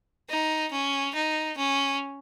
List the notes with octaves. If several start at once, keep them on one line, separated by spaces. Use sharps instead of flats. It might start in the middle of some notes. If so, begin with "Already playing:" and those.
D#4
C#4
D#4
C#4